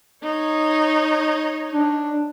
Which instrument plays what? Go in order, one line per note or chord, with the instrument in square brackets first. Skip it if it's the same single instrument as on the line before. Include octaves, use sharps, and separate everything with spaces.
[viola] D#4 C#5
[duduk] D4